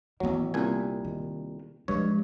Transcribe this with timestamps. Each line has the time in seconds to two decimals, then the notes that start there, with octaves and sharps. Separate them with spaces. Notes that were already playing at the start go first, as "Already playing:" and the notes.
0.20 A1 D#3 F#3 B3
0.54 C2 A#2 G#5
1.05 D#3
1.88 G2 F3 G#3 C#5